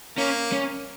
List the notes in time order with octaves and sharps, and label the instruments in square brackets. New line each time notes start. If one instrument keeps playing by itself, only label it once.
[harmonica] A#3 [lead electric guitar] C#4
[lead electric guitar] C#4